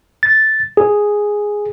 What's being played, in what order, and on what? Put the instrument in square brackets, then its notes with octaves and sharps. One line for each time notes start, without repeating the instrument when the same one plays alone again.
[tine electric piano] A6
G#4